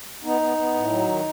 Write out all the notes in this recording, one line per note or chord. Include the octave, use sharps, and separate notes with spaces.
B3 D#4
B3
B3
A2
F#3
D#3